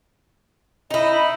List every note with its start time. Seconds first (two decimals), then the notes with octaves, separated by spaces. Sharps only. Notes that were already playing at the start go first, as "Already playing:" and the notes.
0.91 D#4 E4 D#5
1.12 B5